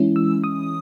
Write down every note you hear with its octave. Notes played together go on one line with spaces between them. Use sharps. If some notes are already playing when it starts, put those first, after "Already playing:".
Already playing: E3 G#3 C#4 E4
E6
D#6